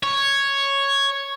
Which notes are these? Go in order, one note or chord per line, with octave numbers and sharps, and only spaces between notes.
C#5